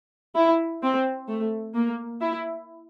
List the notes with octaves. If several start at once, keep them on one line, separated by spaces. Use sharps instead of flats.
E4
C4
A3
A#3
E4